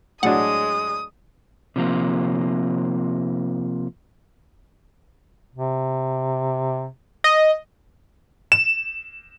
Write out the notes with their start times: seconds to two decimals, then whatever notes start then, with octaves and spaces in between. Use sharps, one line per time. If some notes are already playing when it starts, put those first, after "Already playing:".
0.23 A2 F#3 G#3 D4 F#5 D#6
1.76 C3 F3 A#3
5.55 C3
7.24 D#5
8.52 E7